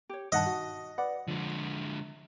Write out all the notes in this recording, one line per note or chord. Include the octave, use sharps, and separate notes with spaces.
G4 C#5
G2 D#3 D#4 D#5 F#5 A5 F#6
F#4
B4 D5 F#5
D3 F3 G#3